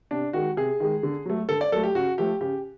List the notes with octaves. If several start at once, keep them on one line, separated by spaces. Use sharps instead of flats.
C3 D4
D#3 G#3 F#4
C3 G#4
D#3 G#3
D3
F#3 A3
D3 A4
D5
F#3 A3 A4
G4
C#3 F#4
F3 A3 G4
C#3 G4